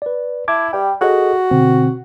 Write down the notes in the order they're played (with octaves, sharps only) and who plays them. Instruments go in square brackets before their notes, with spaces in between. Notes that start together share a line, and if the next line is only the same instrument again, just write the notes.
[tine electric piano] B4 D5
[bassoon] E4 [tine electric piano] A5 D6 G#6
[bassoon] G3 [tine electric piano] G5
[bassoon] F#4 [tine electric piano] G#4 A4 D#5
[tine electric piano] B2 D3 C4